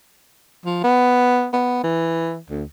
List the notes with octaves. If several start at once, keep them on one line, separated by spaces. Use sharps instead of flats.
F3
B3
B3
E3
D2